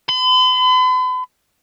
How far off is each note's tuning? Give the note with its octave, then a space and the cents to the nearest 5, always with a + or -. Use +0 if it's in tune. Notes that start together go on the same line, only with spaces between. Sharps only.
B5 +45